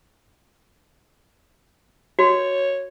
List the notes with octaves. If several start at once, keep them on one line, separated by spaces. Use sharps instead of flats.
F#4 C#5